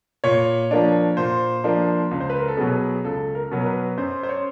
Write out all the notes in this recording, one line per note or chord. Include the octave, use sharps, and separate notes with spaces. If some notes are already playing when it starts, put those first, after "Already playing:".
A#2 C#5
F3 A#3 D4
A#2 C5
F3 A#3 D4
C#2
C5
B4
A#4
A4
B2 F#3 B3 G#4
C#2 A4
A#4
B2 F#3 B3
A#4
B4
F#2 C5
C5
C#5